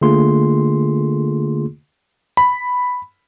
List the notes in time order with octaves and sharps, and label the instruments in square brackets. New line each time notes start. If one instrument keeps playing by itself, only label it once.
[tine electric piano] D3 A3 A#3 F4 G#4 C6
[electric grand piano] B5